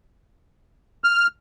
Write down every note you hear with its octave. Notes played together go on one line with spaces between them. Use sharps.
F6